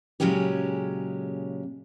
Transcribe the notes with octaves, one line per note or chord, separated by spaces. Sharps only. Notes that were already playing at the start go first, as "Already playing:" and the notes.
A#2 C#3 F#3 G#3 C#4 G4